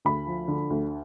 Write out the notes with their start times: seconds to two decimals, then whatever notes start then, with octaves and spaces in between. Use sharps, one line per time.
0.05 D2 B5
0.27 F3
0.48 D3
0.70 D2